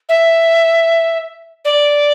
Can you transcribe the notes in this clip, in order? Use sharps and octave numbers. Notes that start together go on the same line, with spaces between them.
E5
D5